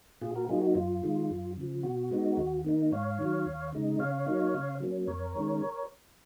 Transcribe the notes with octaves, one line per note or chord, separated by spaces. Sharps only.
A#2 F4 G#4
F#4 A#4
F#3 A#3 D#4 F4 G#4
F#4
F#2 F4
D#3 G#3
F#2
C#3 F3
B2 F#4
G#3 B3 D#4
D#2
D#3 A#3 D#4
G#2 C#5 F5
D#3 F#3
D#2
C#3 G#3 D#4
C#3 C#5 F5
F#3 A#3 D#4
C#3
F#3 A#3 C#4
F2 A#4 C#5
D#3 G#3 C#4